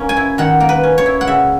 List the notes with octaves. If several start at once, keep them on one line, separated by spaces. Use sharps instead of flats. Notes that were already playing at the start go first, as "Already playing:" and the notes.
Already playing: A#3 C#4
G#5
E4
D#3 F#5
A#3
B4
C#4
C#5
E4
F#5
C#3 E5